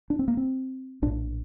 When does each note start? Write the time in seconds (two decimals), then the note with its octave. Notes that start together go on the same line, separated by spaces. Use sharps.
0.10 D4
0.19 C4
0.28 A#3
0.37 C4
1.02 A#1 A2 D4